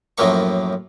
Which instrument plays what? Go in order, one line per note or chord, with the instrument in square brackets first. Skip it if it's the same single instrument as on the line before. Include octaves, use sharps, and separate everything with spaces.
[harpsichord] F#2 A2 F3 F#3 A#3 C#6